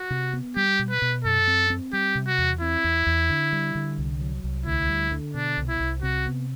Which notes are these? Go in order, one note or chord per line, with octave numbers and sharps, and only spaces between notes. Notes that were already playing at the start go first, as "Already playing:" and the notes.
Already playing: F#4
C3
B3
G3 G4
B2
B4
B2
F#2 A4
C4
C4
G3 G4
C3
F#4
E2
C4 E4
E2
E2
D3
G3
D3
C2
F#3
C2
D2 E4
G3
D3
B2 D4
C2
E4
C2
C3 F#4
B3